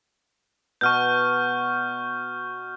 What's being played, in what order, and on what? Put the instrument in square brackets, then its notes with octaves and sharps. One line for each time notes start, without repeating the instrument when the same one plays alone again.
[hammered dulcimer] B2 F#4 A5 [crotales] C#6 F6 G6